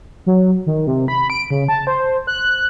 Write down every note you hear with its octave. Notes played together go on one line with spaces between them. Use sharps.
F#3
D#3
C3
B5
D7
C#3
A5
C5
F#6